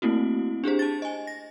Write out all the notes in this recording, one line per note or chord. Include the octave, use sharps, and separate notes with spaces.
A3 A#3 C4 E4 F#4
D4 G4 G#4 C5
A5 A6
D#5 G#5
A#6